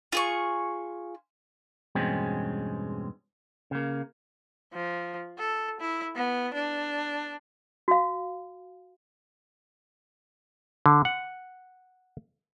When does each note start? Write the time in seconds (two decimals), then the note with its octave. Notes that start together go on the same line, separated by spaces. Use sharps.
0.12 F4 G#4 C#6
1.95 E2 G2 B2 G#3 C4 C#4
3.71 C#3 A#3
4.73 F3
5.39 A4
5.81 E4
6.16 B3
6.54 D4
7.88 F#4 F5
10.86 D3
11.05 F#5